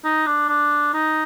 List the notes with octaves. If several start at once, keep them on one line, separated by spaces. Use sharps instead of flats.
D#4
D4
D4
D#4